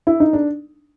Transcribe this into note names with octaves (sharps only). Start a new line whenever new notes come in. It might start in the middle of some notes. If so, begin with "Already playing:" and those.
E4
D#4
D4